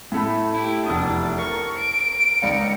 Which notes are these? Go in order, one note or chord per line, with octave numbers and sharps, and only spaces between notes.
A2 A3 B5
E4 G4
F1 E2 D4 D#6
A#4 C#6
D7
C#2 D#4 D5 F5 C#7